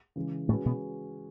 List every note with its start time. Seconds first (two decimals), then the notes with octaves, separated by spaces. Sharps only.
0.16 C#3 E3 G#3
0.49 A2 G#3 A3 C#4 F#4 B4
0.66 B2 B3